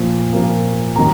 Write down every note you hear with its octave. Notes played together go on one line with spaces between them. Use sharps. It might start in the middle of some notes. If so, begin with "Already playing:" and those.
Already playing: A#2 F3 A#3
A#2 F3 A#3
D#3 F#3 A#3 A#5